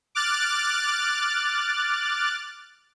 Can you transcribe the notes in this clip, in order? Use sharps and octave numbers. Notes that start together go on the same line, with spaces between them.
D6 F6 F#6 A6